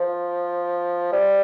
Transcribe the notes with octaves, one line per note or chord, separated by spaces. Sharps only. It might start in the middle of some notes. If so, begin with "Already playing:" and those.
Already playing: F3
G3